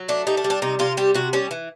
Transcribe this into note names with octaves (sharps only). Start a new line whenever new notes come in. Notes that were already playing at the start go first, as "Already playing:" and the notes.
Already playing: F#3
A3 D4
G3 D#4
D4
G3
D4
C3 D#4
C3 F4
G3 G4
C3 F#4
G3 C#4
E3